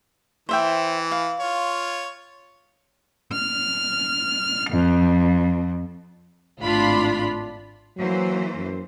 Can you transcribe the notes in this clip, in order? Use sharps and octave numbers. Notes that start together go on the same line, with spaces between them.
E3 C5 E5 G5
F5
F4 C#5
F6
F2
G#1 A2 D4 F4 B5
E3 F#3 A#3 C5
F#2